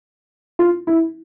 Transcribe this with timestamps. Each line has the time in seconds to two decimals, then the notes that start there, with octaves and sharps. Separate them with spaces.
0.59 F4
0.87 E4